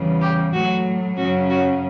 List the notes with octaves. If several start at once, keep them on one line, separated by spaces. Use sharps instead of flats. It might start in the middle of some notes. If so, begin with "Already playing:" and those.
Already playing: E2 C#3 E3 G3
G4
A2 F#3 A3 F#4
F#2 C#3 F#3 C#4 F#4
F#4